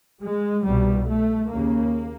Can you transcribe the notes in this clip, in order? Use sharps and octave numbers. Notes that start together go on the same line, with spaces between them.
G#3
C2 B2 G3
A3
D#2 C#3 A#3